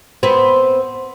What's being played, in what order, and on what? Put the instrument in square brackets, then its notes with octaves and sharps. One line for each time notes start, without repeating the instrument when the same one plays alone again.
[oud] B3 C4